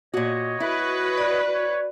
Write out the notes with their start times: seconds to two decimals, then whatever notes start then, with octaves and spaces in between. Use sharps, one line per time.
0.14 A#2 F#4 C#5 D#5
0.60 E4 F#4 B4
1.18 D5
1.54 C#5